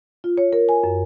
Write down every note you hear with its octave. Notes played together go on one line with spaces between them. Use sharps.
F4
C#5
A#4
G#5
F#2